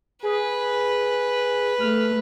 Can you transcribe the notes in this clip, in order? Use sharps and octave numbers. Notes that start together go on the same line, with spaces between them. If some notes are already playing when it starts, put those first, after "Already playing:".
G#4 B4
A3 F6